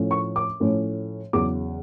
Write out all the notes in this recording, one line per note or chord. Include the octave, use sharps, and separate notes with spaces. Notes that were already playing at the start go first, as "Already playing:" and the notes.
Already playing: A2 F3 A3 C#4
C#6
D6
A2 F3 A3 C#4
E2 C#3 F#3 D6